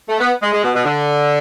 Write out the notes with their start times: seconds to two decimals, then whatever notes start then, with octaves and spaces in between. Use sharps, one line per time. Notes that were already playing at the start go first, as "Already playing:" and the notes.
0.09 A3
0.20 B3
0.41 G#3
0.53 G#3
0.64 B2
0.74 B2
0.85 D3